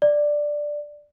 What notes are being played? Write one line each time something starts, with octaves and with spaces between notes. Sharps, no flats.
D5